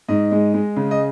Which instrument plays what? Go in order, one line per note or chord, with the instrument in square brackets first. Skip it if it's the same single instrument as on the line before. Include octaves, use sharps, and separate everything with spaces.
[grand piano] G#2 D#5
G#3
G#3
C#3
D#5